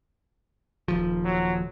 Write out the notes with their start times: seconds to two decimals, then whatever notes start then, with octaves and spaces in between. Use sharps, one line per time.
0.88 D#1 G#1 F3
1.24 F#3